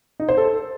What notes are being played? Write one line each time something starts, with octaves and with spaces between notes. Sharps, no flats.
D#4
C5
A4